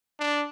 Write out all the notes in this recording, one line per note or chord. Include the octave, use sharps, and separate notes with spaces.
D4